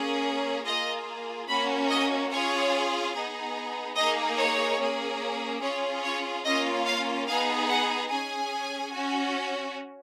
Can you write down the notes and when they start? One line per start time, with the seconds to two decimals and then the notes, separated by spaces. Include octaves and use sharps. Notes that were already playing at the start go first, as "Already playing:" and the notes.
Already playing: A#3 C#4 G#4
0.65 A#3 F4 G#4 D#5
1.48 A#3 C#4 F#4 B5
1.89 D#5
2.30 C#4 F4 G#4 C#5
3.13 B3 D#4 G#4
3.96 A#3 D#4 G#4 D#5
4.37 C#5
4.79 A#3 C#4 G#4
5.61 C#4 F4 G#4 C#5
6.02 C#5
6.44 A#3 C#4 F4 D#5
6.85 F5
7.27 B3 D#4 G#4 F5
7.69 F#5
8.09 C#4 G#4 G#5
8.93 C#4 F#4